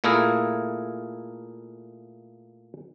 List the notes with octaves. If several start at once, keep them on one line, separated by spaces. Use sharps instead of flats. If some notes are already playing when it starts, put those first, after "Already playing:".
A#2 A3 A#3 E4 G#4 A#4